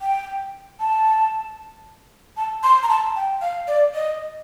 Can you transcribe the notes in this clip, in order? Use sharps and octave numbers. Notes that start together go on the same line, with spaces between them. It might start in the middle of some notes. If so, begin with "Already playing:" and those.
G5
A5
A5
C6
A#5
A5
G5
F5
D5
D#5